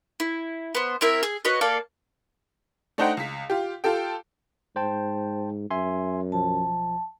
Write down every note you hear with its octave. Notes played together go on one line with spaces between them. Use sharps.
E4
B3 C5
C4 E4 A#4 E5
G#4 G#5
F#4 B4 C#5 D#5
A#3 A4 D5 F5
A3 D4 D#4 C5 F#5 G5
C#2 B6
F4 G4
F4 G4 A4 G5
G#2 C5 G5 A5
F#2 E5 G#5 C6
B1 F3 A5